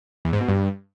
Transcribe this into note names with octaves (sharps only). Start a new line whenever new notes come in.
E2
G#2
B2
G2